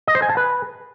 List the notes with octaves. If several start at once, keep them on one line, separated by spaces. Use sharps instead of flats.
D#5
C5
G#5
A5
B4